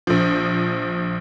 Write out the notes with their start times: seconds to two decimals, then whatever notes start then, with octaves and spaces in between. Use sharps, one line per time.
0.07 A#1 F3